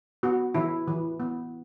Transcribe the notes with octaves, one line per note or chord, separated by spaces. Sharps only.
B3 F#4
E3 E4
E3
B3